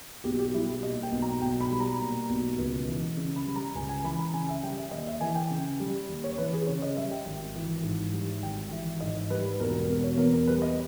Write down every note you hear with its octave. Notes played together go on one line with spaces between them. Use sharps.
B1 G4
G4
G3 E4
G4
A#2 D#5
G5
B1
A#5
B1 G5
B5
G3
A#5
A#2
B1
C#2
E3
C#3
B5
G3
A#5
C#2 G#5
G#5
E3 B5
A#5
C#3 G#5
E5
G3 G5
E5
D#2 D#5
E5
E3 G#5
G5
C#3
G3
D#2
C#5
E3 B4
G#4
C#3 C#5
D#5
G3 E5
G5
G#1
E3
G#2
G3
G#1 G5
E3 E5
G#2 D#5
G3 B4
E1 A#4
A#4
B2
C#5
E2 A#4
A#4
G3 B4
D#5